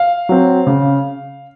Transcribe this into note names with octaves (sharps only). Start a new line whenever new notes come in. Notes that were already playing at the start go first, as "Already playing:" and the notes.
Already playing: F5
F#3 C4
C#3